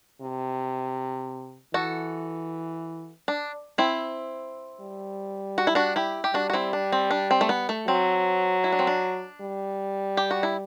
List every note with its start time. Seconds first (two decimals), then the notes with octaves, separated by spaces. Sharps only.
0.21 C3
1.74 E3 F#4 A4
3.28 D4
3.78 C4 E4
4.81 G3
5.58 F#4
5.67 E4
5.75 D4 F#4
5.96 E4 G4
6.24 G4
6.34 G3 D4 F#4
6.50 F#4
6.53 C4 E4
6.73 D4
6.92 C4
7.11 D4
7.31 C4
7.41 A3
7.49 B3
7.69 A3
7.88 F#3 C4
8.64 E4
8.72 D4
8.79 C4
8.87 D4
9.41 G3
10.17 G4
10.31 F#4
10.43 E4